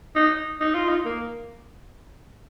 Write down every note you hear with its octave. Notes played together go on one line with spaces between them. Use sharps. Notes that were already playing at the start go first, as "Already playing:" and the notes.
D#4
D#4
F4
D#4
A#3